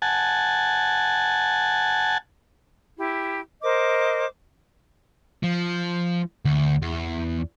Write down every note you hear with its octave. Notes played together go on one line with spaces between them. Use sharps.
F#5 G#5 A5
E4 G4
A#4 C5 D#5 D6
F3
D2
E2